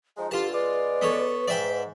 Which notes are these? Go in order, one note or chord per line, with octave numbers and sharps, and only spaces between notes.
F3 G#3 D#4 D#5
G2 D3 F4 G4 A5
C#2 G#3 B4 D5
B3 A4 C#5
G#2 D5 E5 G5